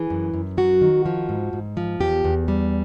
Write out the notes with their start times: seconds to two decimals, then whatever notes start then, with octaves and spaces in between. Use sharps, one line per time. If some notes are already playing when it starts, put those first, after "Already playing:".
Already playing: E3 G#4
0.10 F#2
0.34 F#2
0.57 F#3 F#4
0.81 D#3
1.06 F3
1.29 G#2
1.53 G#2
1.77 F3
2.00 E2 G4
2.24 E2
2.48 G3